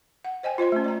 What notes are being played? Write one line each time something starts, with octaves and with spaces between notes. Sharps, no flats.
F#5
C5 D#5 G5 G#5
F4 C5 D#5 C6
A3 C#4
D5 A#5